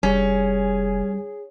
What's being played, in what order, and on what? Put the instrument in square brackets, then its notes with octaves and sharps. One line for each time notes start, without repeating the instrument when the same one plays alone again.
[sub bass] F1 [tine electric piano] G3 [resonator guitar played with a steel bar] C#4 [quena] G#4